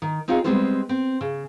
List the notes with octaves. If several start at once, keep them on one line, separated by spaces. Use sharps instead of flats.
D#3
C4 D#4 F4 G#4 C#5
G3 G#3 B3 C4 F4 C5
C4
C#3